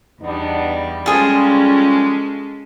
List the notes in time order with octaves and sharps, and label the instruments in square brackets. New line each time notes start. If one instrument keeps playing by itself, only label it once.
[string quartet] E2 G3 [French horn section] B3 D4 D#4
[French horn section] F3 G3 [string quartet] G#3 C#4 A4 [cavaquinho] F4 G#4 C5